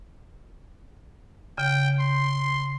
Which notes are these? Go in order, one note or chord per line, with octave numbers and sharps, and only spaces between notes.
C#3 G5
C6